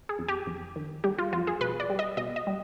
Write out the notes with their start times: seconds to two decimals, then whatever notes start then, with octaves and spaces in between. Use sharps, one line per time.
0.09 G#4
0.19 F2
0.28 G4
0.47 F2
0.76 D#3
1.04 G3 G4
1.19 F4
1.33 F2 F4
1.47 G#4
1.61 B2 B4
1.80 D5
1.90 G3
1.99 D#5
2.17 B2 D#5
2.36 D#5
2.47 G3